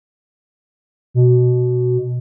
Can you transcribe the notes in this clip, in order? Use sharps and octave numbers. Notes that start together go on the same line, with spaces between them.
B2